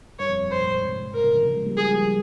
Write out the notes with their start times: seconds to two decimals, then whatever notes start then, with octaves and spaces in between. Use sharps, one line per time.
0.19 G2 C#5
0.30 F2
0.41 F2
0.51 G2 C5
0.61 A#2
0.66 G#2
0.82 G#2 C3
0.98 G#2
1.14 G2 A#4
1.24 A#2 C#3
1.35 C3 E3
1.45 C#3 F3
1.56 F3 G#3
1.66 G3 A#3
1.76 F3 G#3 G#4
1.93 G3 A#3